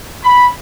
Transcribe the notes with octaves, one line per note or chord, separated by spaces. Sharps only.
B5